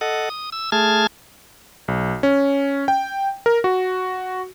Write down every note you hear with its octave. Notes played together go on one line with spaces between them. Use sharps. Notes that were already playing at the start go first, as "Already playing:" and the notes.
A4 D#5 F#5
D#6
E6
A3 G#4 A5 F6 G#6
B1
C#4
G5
A#4
F#4